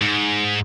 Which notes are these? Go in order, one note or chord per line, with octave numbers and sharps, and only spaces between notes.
G#2